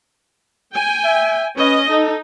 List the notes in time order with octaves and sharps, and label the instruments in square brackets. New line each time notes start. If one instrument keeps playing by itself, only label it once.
[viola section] G5 G#5
[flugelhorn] E5
[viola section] C#4 D#5 [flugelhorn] B4
[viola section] D#4 [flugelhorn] A4